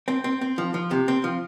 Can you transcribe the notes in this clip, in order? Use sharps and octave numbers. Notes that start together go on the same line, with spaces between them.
C4
C4
C4
F3
F3
C3
C4
F3